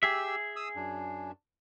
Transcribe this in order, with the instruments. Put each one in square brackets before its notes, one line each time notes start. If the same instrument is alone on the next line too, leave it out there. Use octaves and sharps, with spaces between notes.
[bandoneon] G4 E6 [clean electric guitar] G#4 E5
[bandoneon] D#6 E6
F#2 D4